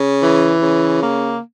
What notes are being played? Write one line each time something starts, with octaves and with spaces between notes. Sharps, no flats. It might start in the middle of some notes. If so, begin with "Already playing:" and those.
Already playing: C#3
E3
C#3
A#3